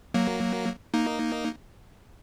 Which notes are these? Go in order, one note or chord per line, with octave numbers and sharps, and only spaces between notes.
F#3 A#3
A#3 D#4